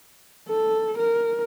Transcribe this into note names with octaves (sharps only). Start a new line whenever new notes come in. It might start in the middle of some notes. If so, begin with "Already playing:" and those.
A4
A#4